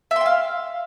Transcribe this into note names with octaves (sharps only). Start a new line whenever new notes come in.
E5 F5 G5 C6